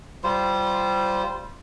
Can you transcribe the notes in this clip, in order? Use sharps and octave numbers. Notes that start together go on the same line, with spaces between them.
G3 F4 C5